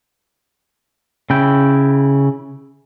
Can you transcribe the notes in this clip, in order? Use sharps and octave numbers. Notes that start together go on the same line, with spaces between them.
C#3 E4 G5